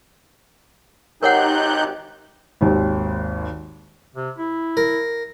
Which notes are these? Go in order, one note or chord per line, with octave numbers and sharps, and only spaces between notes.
G#1 D#4 G4 A#4 C#5 F#5 F#6 G6
G#1 D#2
C3
E4
A#4